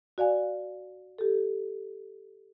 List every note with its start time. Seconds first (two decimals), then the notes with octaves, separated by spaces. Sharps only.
0.18 F#4 D5 F5 G#5
1.18 G4 A4